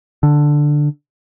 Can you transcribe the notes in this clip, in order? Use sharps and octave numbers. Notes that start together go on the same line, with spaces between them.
D3